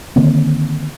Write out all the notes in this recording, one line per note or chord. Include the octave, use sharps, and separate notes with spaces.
D3 D#3 A#3 C4